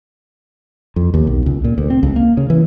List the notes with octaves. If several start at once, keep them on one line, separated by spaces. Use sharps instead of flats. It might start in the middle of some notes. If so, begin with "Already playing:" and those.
F2
D#2
B1
C#2
A#2
D2
C4
C#2
A#3
C#3
E3